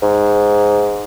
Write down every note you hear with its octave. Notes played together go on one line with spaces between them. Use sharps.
G#2